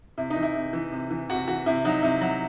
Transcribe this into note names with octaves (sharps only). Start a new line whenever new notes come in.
C3 E4
D#4
E3
E4
C3
E3
C3
E3
C3 F#4
E3 F#4
C3 E4
F#3 D#4
C3 E4
F#3